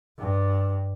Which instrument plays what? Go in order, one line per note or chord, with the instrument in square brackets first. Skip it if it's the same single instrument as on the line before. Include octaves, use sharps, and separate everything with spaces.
[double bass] G2